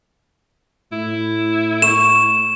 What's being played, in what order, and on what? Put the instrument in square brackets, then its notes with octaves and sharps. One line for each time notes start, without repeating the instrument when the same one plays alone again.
[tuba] A2 [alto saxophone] E4
[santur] C#6 [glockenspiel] E7